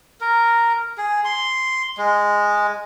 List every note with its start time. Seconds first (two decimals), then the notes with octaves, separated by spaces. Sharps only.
0.21 A#4
0.98 G#4
1.25 C6
1.98 G#3